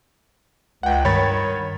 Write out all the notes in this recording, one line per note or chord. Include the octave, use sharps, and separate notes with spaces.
C#2 F#5 G5
G2 D#3 C#5 B5 A6